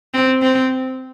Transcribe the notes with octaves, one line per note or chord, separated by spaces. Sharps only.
C4
C4